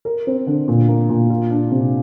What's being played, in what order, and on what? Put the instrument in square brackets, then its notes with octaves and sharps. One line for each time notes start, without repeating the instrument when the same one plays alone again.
[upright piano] A#4
C4
D3
A#2
A#3
A#2
F4
D4
C3